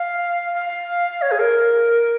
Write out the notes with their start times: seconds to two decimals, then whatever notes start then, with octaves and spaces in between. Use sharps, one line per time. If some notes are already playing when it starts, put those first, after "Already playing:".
Already playing: F5
0.53 F5
1.22 C#5
1.31 G#4
1.39 A#4